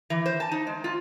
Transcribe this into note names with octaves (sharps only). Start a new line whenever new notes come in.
E3
C5
A5
D#4
G#3
F4